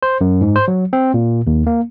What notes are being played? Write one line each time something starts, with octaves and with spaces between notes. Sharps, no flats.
C5
F#2
G#2
C5
F#3
C4
A#2
D#2
A#3